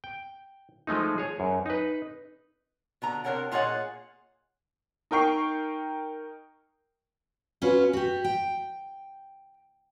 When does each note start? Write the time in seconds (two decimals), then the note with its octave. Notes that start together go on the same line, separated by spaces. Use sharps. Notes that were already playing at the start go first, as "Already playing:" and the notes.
0.04 G5
0.87 F3 G#3 A3 D#4
1.18 G#4 C#5
1.40 F#2
1.66 D#4 B4
3.02 B2 D3 A#5
3.24 C3 D4 A#4 C#5 F#5 G5
3.52 A#2 F4 G#4 C#5 D#5 F#5
5.11 D#4 A#4 G5 C#6 C7
7.62 C#4 F4 F#4 B4
7.93 F#4 G4
8.24 G5